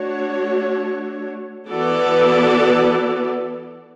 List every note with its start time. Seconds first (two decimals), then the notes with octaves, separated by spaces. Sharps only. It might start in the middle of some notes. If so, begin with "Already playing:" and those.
Already playing: A3 D4 F#4 C#5
1.68 E3 B3 F#4 A4 D5